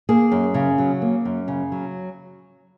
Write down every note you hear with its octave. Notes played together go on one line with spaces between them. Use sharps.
A#3 G#4
F#2
C#3
F#3
A#3
F#2
C#3
F#3